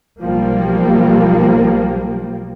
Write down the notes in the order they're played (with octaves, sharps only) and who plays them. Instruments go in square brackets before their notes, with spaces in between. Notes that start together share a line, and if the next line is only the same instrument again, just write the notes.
[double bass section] B1 F3 G3 A#3